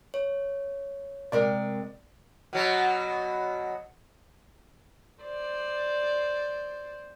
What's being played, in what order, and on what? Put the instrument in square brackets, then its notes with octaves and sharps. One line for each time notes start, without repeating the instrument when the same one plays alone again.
[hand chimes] C#5
[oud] C3 G#3 A#4 [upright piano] D5
[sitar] B2 F#3
[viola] C5 D5